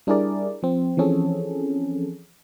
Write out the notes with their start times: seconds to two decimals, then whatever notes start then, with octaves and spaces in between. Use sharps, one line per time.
0.07 G3 D4 E4 G#4 A#4 D5
0.63 F3 C4
0.97 E3 F3 C4 C#4 G#4 A4